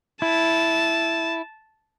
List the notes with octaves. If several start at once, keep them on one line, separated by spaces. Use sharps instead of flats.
E4 A5